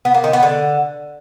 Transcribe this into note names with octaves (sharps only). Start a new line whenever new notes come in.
B3
A#3
D#3
B3
D3